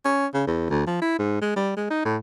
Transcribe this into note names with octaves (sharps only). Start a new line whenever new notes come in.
C#4
C#3
E2
D2
F3
E4
G#2
G#3
G3
G#3
D#4
A2